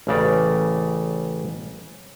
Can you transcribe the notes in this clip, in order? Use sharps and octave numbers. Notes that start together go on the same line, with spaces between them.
A1 C#3 D5